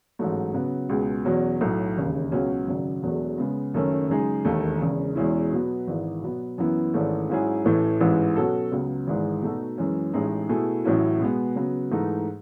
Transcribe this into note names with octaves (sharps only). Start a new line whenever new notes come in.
A1 G#2 F#3 A3
C#3 F#3 B3
C#2 B2 G#3
E2 B2 F#3 C#4
B1 A2 F#3 A3
E1 D#2 C#3
C#2 B2 F#3 C#4
G#1 F#2 C#3 F#3
E1 E2 B2 F#3 A3
C#3 G#3 B3
F#1 F#2 D#3 A3 C#4
F#2 C#3 G#3 D#4 G#4
E1 D#2 D#3 A3
E1 E2 C#3
E2 B2 G#3 C#4 E4
B2 F#3 B3
G#1 G#2 E3
B2 F#3 B3
F#2 E3 B3 E4
G#1 G#2 E3 A3 C#4
G#2 F#3 C#4 E4 G#4
A1 A2 E3 A3
A1 G#2 E3
B2 F#3 C#4 F#4 A4
C#2 C#3 F#3 B3
G#1 G#2 E3 G#3
B2 A3 D#4 F#4 A4
F#2 E3 G#3 C#4
A1 A2 G#3 D#4
B2 A3 E4 G#4
A1 A2 F#3 C#4 E4
B2 G#3 B3
C#3 F#3 B3
G#2 E3 A3 D#4